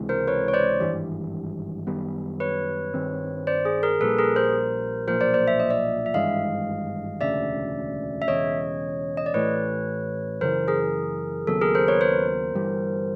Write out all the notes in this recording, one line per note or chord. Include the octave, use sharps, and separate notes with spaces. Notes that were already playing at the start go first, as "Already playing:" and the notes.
Already playing: C#2 C3 E3 G#3
A#4 C5
B4 C#5
C#5
C5 D5
G#1 G2 E3 G3
F#2 D#3 G3 B3
B4 C#5
G2 D#3 G3 C4
C5 D5
G#4
G#4 A#4
A#1 A#2 G3 A4 B4
G#4 A#4
A#4 C5
B1 A#2 F3 A#4 C5
C5 D5
C5 D5
E5
D#5
D5 E5
E5
G#1 G2 E3 G#3 D#5 F5
E1 D2 C#3 D5 E5
E5
E1 E2 C#3 C#5 D#5
D#5
D5
A1 A2 E3 A3 B4 C#5
F#2 C#3 E3 A#4 C5
G#4 A#4
D#2 C#3 F#3 B3 A4
G#4 A#4
A#4 C5
B4 C#5
A#4 C5
G1 G2 E3 G3